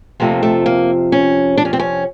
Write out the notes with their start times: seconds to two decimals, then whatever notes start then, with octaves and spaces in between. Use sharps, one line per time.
0.20 F2 C3 F3 A3 A#3
0.43 A3
0.66 A#3
1.12 C#4
1.58 D4
1.65 C#4
1.73 C4
1.80 C#4